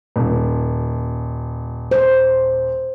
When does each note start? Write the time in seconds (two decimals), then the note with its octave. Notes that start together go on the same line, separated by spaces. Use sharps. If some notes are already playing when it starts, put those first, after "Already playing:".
0.16 D#1
1.91 C5